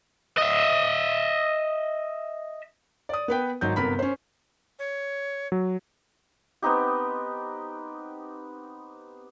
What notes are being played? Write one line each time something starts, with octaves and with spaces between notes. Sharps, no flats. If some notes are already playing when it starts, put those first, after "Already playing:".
D#5 E5
D5 D#6
B3 B4 G5
G#1 F#3 D#4 G6
G1 C3 B3 A#4 B5 B6
C#4 C5
C#5
F#3
B3 C4 D#4 G4